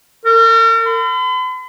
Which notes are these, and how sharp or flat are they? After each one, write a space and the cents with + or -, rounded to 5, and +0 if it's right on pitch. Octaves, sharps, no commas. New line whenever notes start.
A#4 -45
B5 +45